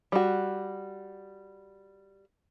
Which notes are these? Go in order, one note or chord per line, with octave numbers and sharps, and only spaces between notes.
G3 F#4